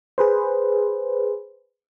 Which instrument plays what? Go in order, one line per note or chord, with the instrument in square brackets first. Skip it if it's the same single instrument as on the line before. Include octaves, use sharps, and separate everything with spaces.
[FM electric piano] G#4 B4 C5